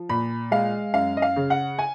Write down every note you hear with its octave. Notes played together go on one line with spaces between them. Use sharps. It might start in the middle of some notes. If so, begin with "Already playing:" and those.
Already playing: F3
A#2 B5
G#3 F5
F#2 F5
D#5
F5
C#3
F#5
G#5